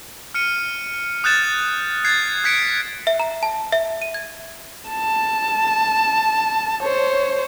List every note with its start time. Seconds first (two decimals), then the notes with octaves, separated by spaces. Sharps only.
0.34 F6 C#7 D#7
1.24 D#6 F#6 G6 A6 E7
2.05 F#6 G#6 A6 C7
2.44 F#6 G#6 B6 C#7 D7
3.07 E5
3.20 A#5
3.43 A5
3.72 E5
4.02 D#7
4.14 G#6
4.90 A5
6.83 C5 C#5